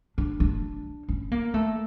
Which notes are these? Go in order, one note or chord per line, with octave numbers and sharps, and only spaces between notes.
D4
D4
C#4
A#3
A3